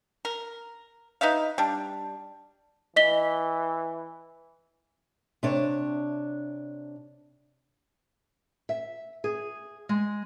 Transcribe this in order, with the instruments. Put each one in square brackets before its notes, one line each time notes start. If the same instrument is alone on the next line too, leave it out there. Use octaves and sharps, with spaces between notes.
[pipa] A#4
D#4 B4 E5 F5
G3 D4
[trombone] E3 [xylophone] D#5 B6 G7
[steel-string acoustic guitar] C3 D4 C#5
[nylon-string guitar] E5
G#4
G#3